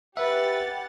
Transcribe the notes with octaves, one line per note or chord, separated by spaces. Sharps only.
G4 B4 E5 F#5 A6